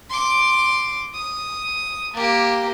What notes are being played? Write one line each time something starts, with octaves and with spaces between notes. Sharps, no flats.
C6 D6
D#6
A#3 G4